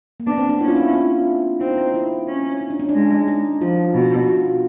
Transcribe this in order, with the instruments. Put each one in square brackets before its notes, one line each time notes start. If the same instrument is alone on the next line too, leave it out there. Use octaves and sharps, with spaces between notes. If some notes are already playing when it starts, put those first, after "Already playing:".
[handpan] A#3
[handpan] B3 [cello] D4
[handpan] C4
D4
[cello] C#4 [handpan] E4
[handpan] F4
E4
F4
[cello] C4 [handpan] D#4
[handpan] E4
[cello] C#4
[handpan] D#4
D4
C#4
D4
[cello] G#3
[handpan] D#4
[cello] F3 [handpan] F4
[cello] B2
[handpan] F#4
F4